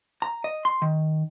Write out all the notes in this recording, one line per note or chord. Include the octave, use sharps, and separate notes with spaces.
A#5
D#5
C6
D#3